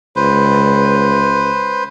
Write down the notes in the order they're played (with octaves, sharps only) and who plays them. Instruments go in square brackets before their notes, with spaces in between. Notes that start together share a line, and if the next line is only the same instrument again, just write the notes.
[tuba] C#2 [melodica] B4 C5